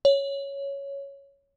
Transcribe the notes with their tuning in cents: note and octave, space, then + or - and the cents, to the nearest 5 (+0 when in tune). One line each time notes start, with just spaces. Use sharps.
C#5 +5